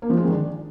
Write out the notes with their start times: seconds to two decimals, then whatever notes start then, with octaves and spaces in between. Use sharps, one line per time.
0.02 A#3
0.10 F3
0.17 G#3
0.25 D#3
0.32 D4